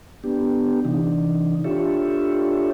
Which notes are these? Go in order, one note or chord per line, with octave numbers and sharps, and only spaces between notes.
B3 D4 G4
C3 E3 D4 D#4
D4 F4 G4 A4 C#5 E5